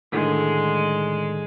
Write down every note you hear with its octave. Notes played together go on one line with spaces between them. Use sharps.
A2 D3 D#3 G#3